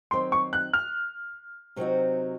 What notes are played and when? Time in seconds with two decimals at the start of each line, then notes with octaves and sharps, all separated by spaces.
0.11 D#3 F#3 C4 D#4 C6
0.32 C#6
0.53 F#6
0.73 F6
1.76 C3 F#3 C4 D#4 F#4